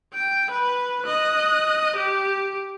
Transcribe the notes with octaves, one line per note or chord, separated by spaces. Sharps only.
G5
B4
D#5 F#6
G4